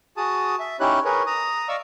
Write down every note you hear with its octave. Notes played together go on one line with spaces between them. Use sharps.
F#4 G#4 A5 D#6
E5
C#4 D#4 E4 G4 C#5 F#6
G#4 A#4 B4 C#5
A#5 D#6
D5 D#5 F5 C#6 E6